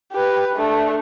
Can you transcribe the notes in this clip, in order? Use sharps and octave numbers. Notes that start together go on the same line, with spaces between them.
G4 B4
A3 D4